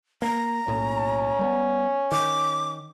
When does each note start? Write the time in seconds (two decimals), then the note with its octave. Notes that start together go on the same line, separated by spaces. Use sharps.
0.22 A#3 A#5
0.67 B1 A2 A#3 C#4
1.39 G3 A3 B3
2.12 D#3 D6